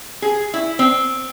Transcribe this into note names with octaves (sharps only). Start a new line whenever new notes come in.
G#4
E4
C4